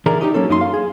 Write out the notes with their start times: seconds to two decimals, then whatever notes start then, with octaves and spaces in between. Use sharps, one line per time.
0.06 D3 E3 G#4 A#4 D5 A#5
0.21 D#4 G4 D#5
0.34 F#3 A#3 C#4 A4
0.49 F#2 D#4 E4 C6
0.61 F5
0.74 G#4